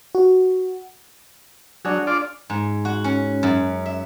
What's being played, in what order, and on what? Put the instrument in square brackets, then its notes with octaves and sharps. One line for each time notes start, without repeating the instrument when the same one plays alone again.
[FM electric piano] F#4
[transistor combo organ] F#3 [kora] D4 G#4 C#5
[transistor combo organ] F4 D5
[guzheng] G#2
F#4
C#4
F#2
E5